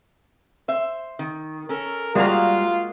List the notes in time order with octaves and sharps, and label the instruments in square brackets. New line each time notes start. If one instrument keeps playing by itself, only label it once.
[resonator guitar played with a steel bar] C5 E5
D#3
[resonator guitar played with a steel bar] C#4 A4 [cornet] A#4
[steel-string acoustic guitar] G3 A#5 [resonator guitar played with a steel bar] G#3 A#3 F#4 [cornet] F4